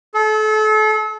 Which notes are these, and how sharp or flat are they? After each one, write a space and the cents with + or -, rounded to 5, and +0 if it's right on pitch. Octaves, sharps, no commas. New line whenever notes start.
A4 -35